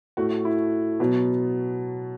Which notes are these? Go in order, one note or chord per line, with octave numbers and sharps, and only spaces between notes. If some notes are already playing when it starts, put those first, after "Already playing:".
A2 A3 F#4
E4
B2 F#3 B3